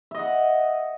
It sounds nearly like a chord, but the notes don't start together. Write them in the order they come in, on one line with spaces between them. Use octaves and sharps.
E5 D#5 F#5